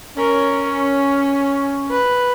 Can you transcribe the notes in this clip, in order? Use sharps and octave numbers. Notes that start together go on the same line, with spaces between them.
C#4 A#4
B4